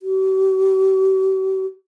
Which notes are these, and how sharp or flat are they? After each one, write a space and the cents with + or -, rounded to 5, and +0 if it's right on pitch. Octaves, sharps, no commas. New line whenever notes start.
G4 -45